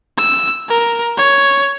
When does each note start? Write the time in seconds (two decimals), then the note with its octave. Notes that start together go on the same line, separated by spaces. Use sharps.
0.18 E6
0.69 A#4
1.17 C#5